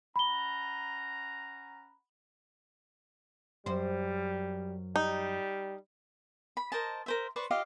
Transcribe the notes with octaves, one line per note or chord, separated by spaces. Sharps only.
C#4 F#5 A#5 B5 G7
F#2 G3 C5
G3 D#4
B5
A#4 C5 D#5 A5
A#4 C5 E5
B4 C5 D5 C#6
F4 G4 D#5 F5